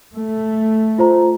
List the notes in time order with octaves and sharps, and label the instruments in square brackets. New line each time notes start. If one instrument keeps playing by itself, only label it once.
[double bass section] A3
[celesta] F4 C5 A#5